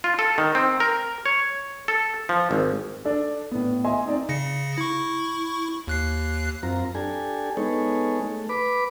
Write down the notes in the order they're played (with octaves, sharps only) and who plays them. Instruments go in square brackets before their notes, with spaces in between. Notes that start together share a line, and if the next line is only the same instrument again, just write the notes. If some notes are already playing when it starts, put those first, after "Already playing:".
[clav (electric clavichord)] F4
A4
D#3
C4
A#4
C#5
A4
F3
G#1
[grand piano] D4 A4
A2 B3
F4 D#5 E5 G#5 C6
C4 D#4 D5
[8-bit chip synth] C#3 A#6 C#7
E4 C#6
D#2 F#6 C7
[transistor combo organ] F#2 C4 F4 A#5
D4 G4 A4 G#5
G#3 B3 D#4 G#4 A4 C#5
A3
B4 B5 D6